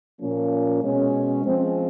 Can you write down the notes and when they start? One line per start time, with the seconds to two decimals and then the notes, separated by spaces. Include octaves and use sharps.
0.21 A#2 F3 A#3 C#4
0.82 B2 G#3 C#4
1.43 F3 G#3 C4